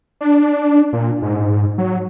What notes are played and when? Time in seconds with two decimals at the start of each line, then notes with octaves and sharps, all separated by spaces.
0.21 D4
0.93 A#2
1.22 G#2
1.78 F#3